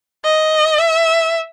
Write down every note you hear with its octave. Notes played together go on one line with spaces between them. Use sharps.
D#5
E5